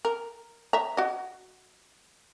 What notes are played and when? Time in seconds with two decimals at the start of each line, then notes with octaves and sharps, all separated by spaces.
0.05 A#4
0.73 E5 A#5
0.97 F#4 D#5